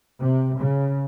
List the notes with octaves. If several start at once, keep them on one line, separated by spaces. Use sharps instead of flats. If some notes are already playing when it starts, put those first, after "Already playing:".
C3
C#3